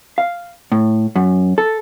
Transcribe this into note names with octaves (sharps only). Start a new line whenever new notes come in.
F5
A2
F#2
A4